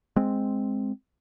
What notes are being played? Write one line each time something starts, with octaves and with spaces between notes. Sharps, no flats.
G#3 C4